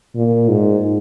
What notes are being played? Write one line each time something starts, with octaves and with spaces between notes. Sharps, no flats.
A#2
G#2